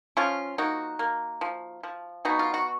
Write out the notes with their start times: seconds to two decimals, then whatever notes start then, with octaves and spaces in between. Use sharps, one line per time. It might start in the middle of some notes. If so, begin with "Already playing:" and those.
0.17 F3 C#4 F4
0.58 A#3 D#4 F#4
0.99 A#3
1.41 F3
1.83 F3
2.25 B2 D#4 F#4
2.39 F4
2.54 F#4